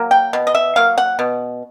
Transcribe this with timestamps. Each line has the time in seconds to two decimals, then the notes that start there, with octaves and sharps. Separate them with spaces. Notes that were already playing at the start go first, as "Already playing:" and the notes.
Already playing: F#3 A#3
0.11 G5
0.33 B2
0.47 D#5
0.55 E5
0.76 F#3 A#3 F5
0.98 F#5
1.19 B2